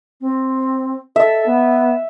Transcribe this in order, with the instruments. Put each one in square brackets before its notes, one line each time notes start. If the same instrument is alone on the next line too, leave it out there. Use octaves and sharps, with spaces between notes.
[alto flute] C4
[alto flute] A4 [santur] E5
[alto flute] B3